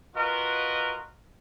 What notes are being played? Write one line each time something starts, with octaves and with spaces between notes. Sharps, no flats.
F4 F#4 A#4 B4 D#5